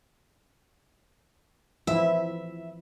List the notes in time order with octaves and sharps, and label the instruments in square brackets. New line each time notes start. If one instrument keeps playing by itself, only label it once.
[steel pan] E3 F3 E4 [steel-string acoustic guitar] E5